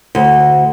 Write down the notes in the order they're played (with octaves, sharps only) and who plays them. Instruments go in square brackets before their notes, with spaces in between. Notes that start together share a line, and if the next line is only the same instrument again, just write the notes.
[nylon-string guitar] D2